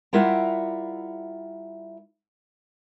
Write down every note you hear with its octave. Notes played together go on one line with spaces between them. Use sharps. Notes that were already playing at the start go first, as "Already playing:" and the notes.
G3 E4 F4 A#4 E5 F#5